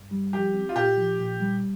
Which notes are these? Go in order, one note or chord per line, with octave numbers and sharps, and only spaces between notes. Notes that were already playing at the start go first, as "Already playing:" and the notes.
Already playing: G2
G3
F3 G4
C4
F4
A#2 G4
F3
A#2
G3